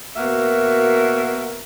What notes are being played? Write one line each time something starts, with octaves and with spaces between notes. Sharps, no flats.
B2 A#3 F#4 A#4 E5